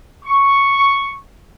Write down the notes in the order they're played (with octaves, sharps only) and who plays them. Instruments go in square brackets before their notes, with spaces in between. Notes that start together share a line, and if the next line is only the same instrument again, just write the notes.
[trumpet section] C#6